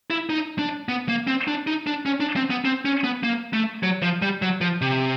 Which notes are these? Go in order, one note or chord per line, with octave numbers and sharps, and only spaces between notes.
E4
D#4
D4
B3
A#3
C4
D4
D#4
D4
C#4
D4
C4
B3
C4
C#4
B3
A#3
A3
F#3
F3
G3
F#3
F3
C3